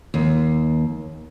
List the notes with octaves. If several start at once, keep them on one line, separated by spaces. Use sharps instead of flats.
D#2